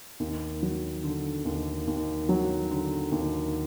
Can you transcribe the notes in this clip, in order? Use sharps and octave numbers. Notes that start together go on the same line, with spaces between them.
D#2
F#3
D3
D#2
D#2
F#3
D3
D#2